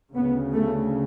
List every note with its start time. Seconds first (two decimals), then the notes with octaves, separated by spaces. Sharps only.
0.14 D2 C#3 B3
0.53 A3